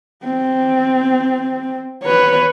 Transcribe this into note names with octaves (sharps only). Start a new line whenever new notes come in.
C4
B4 C#5